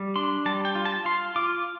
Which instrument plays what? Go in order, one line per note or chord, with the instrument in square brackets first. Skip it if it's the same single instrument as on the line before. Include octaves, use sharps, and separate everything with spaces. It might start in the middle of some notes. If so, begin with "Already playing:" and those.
Already playing: [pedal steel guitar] G3
D4 C6
G3 A5
G5
F4
A5
F4 C6
F4 D6